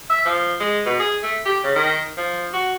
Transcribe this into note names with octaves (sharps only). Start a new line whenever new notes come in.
E5
F3
G#3
B2
G#4
A3
G4
C#3
D#3
F3
F#4